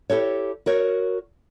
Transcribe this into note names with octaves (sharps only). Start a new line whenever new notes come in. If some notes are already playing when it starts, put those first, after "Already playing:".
E4 G4 A4 C#5
F#4 A#4 C#5